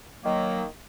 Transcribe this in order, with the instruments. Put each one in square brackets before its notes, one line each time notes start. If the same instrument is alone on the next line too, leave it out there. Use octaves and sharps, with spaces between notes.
[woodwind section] D#3 F#3 A#3